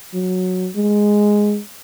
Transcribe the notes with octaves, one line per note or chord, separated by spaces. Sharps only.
F#3
G#3